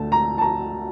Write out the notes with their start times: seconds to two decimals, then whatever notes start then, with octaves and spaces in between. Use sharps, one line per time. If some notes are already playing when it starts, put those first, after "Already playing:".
Already playing: D2 D3 A3 A5
0.12 A#5
0.38 A5
0.42 A#5